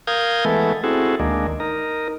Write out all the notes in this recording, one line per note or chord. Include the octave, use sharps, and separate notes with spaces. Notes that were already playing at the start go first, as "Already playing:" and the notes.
A#4 F5 D#6 G6 G#6
E3 G#3 A3 B3 A4
C4 E4 F#4 G#4 A4
D2 D#3 G#3 A#3 D4
D#4 A#4